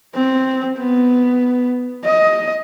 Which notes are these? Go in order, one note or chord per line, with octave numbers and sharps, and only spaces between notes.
C4
B3
D#5